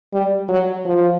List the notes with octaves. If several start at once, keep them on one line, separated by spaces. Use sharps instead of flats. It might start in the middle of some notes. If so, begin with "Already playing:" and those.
G3
F#3
F3